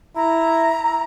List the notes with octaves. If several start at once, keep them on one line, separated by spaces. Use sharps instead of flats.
E4 A#5